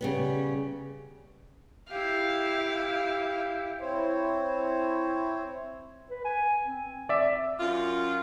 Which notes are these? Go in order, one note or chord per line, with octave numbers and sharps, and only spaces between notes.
C#3 G3 B3
E4 G4 F5
C4 E4 C5 C#5
B4
G#5
C4
D5 E5
F#2 F4